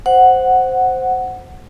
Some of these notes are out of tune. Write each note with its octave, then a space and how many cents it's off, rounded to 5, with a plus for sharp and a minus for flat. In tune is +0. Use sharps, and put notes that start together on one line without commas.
C5 +0 F#5 +0